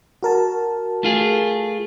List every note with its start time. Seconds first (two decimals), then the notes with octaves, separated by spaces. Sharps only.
0.23 F#4 A#4 A5
1.03 A3 F4 G#4